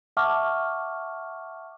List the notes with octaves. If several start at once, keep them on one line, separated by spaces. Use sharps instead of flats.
E5 F#5 A5 C#6 D6 F6